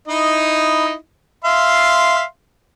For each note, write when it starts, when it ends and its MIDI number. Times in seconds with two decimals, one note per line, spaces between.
0.08 0.94 63
0.08 0.94 64
0.08 0.94 75
1.44 2.23 76
1.44 2.23 77
1.44 2.23 84